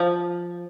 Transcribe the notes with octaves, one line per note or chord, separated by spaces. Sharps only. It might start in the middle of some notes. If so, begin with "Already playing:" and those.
Already playing: F3